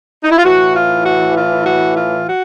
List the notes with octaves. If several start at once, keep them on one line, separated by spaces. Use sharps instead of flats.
D#4
E4
F4
A2 E3 F#4
F4
F#4
F4
F#4
F4
F#4